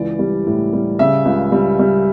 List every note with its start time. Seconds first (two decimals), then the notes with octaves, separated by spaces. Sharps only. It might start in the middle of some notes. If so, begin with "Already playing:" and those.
Already playing: C#2 E3 D5
0.19 G3
0.47 A2
0.73 G3
0.99 C#3 E5
1.25 C#2
1.52 G3
1.79 G3